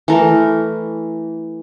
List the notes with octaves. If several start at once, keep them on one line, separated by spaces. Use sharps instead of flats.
E3 A3 A4 A#4